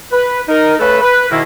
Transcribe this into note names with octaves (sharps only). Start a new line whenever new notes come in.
B4
D#4 A#4
C#3 A3 A4 B4
B4
G#2 B2 D#3 A#3 E4